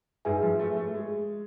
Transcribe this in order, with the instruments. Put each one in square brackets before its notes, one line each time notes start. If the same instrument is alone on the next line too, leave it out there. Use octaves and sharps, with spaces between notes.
[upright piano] G#2 [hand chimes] G#4 B4 E5 G#5
[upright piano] F3
A3
A3
G#3